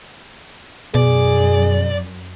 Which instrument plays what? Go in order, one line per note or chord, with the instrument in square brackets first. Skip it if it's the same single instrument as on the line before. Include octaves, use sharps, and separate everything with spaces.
[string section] F#2 [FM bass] B2 [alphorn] G#4 [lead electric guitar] D5